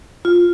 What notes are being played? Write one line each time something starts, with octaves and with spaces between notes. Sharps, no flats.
F4